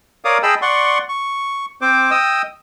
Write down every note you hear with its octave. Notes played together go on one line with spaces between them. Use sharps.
A#4 C#5 D5 F5 D6 D#6
G#4 D#5 G5 A5 B5 E6
D5 F#5 C6 C#6
C#6
C4 C5 D6
D#5 G5 D#6 E6